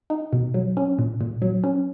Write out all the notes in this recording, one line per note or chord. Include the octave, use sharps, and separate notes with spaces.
D#4
B2
F#3
C#4
A#2
A#2
F#3
C#4